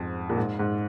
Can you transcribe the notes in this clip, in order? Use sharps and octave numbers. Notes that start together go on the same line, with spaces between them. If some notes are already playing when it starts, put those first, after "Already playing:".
Already playing: F2 G#2
A#2
G#2
G#2